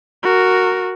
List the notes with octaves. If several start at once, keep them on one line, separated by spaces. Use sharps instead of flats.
F#4 A#4